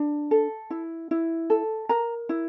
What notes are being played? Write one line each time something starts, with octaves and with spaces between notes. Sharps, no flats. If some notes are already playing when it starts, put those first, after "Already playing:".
Already playing: D4
A4
E4
E4
A4
A#4 A#5
E4